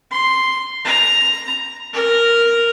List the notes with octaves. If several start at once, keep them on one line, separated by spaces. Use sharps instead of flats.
C6
A#5
A#4